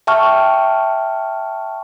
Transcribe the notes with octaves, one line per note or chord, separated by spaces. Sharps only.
E5 G5 A5 C#6 F6